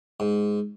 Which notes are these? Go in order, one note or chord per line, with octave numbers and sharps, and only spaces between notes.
G#2